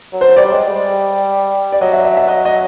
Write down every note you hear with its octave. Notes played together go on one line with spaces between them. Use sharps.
F#3
C5
G3 D5
G#3
G3
D5
F#3 D#5
E5
E5
E5
D#5
D#5